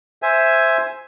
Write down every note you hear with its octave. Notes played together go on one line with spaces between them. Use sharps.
C5 E5 G#5